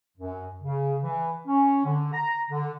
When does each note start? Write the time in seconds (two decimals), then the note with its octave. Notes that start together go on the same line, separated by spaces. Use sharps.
0.17 F#2
0.62 C#3
1.02 E3
1.47 C#4
1.85 D3
2.13 A#5
2.50 D3